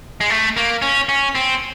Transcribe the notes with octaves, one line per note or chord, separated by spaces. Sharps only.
G#3
A3
A#3
C#4
C#4
C4